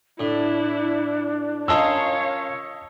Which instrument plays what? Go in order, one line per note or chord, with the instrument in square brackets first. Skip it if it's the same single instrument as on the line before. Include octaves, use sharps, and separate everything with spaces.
[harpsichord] A2 [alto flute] D4 [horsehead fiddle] E4
[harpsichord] C#4 F4 A#4 [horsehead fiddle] C#5 F5 [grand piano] D#5 A5 E6